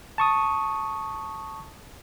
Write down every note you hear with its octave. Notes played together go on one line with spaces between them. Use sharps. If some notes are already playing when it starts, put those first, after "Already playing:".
A5 C#6 D#6